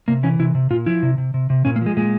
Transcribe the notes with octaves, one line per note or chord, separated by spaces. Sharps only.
C3 A#3
E3 C#4
C3 E4
C3
A#2 F4
F3 E4
C3
C3
C3
C3
A#2 C#4
A#3
F3 G#3
A#2 G#3